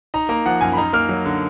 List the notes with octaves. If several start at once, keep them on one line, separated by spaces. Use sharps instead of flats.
D#4 A#5
A#3 A#5
F3 F#5
F#2 G#5
B5
D#4 A#5
A#3 F6
F#3
D3